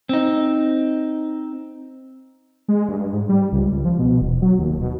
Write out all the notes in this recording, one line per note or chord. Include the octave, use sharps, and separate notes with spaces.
C4 D#4
G#3
G2
G#2
G3
C#2
C#2
F3
B2
E1
F#3
D#2
B2